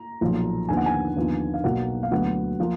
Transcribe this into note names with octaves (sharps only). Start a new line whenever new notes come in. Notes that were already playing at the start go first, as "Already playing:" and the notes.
Already playing: A#5
B1 A#2 F3
D#2 D3 F3 B3 G#5
F#5
G#5
D#2 D3 F3 B3
F5
B1 B2 F#3 A#3 F#5
F5
D2 D3 F#3 B3 F#5
F3 A#3